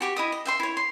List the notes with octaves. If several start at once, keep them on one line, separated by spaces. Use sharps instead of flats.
F#4 G4 C#6
E4 D#5 D#6
D#5
E5 G5 C6
E4 C#5
C6